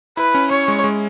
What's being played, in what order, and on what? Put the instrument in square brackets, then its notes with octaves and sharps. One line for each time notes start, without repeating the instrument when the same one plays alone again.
[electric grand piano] E4 [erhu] B4
[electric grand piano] C#4
[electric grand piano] C#4 [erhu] C#5
[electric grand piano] G#3
G#3